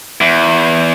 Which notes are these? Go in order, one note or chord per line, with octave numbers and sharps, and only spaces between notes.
E2